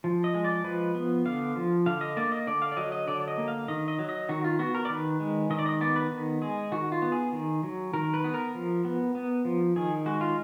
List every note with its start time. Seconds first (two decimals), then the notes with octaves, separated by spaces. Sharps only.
0.04 F3
0.24 D#5
0.34 G#3
0.44 D5
0.64 F3 B4
0.95 B3
1.25 D3 F5
1.56 F3
1.86 D3 F5
2.01 D#5
2.17 A#3 D5
2.32 D#5
2.47 D3 D5
2.62 F5
2.72 D5
2.77 F#3 D#5
2.92 D#5
3.08 D3 D5
3.20 D5
3.28 D#5
3.38 A#3
3.48 F5
3.68 D#3 D#5
3.88 D#5
3.99 F#3
4.09 D#5
4.29 D#3 F#4
4.44 F4
4.59 B3 F#4
4.75 A#4
4.85 D5
4.90 D#3 B4
5.20 G#3
5.50 D#3 D#5
5.59 D5
5.66 D#5
5.81 B3 D5
5.96 B4
6.11 D#3
6.42 G#3 G#4
6.72 D#3 F#4
6.92 F4
7.02 B3
7.12 G#4
7.33 D#3
7.63 F#3
7.93 D#3 A#4
8.14 B4
8.24 B3
8.34 A#4
8.55 F3
8.85 B3
9.15 B3
9.45 F3
9.76 D#3 G#4
10.06 G#3 F#4
10.21 F4